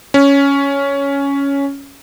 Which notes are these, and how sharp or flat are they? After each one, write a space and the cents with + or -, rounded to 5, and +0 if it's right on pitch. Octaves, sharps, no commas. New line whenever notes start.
C#4 +5